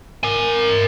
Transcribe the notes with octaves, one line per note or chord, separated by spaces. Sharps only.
A#4 G#5